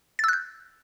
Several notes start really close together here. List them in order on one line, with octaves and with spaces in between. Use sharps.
A6 E6 F#6 G6